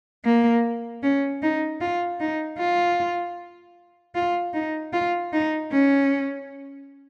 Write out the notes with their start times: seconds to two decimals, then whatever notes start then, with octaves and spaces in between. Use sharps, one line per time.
0.25 A#3
1.02 C#4
1.42 D#4
1.80 F4
2.20 D#4
2.59 F4
4.15 F4
4.54 D#4
4.93 F4
5.33 D#4
5.71 C#4